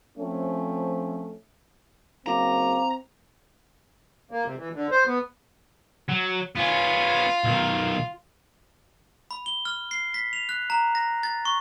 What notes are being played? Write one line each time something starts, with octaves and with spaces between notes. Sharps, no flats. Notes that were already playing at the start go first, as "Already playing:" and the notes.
F3 A3 C4 C#4
F#1 C4 F5 A#5 D6
A#3
C3
E3
D3
C5
B3
F#3
B3 C#4 F4
B1 D#3
B5
G7
F6
C7
B6
F7
F#6
A#5
A#6
A6
C#6